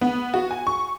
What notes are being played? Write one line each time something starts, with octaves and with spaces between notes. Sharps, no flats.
B3
F#4
G#5
C#6